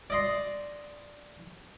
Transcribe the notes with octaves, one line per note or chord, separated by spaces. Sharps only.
D5 D#5 C6